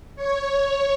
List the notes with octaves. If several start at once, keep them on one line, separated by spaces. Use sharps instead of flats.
C#5